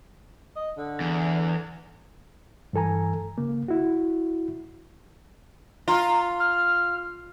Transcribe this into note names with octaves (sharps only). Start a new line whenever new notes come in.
D#5
D3
E2
G2 E3 A4 G#5 A#5
C#3 A#3
E4 F#4
F4 A#5
F6